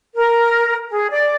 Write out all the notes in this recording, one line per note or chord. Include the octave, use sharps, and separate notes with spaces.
A#4
G#4
D5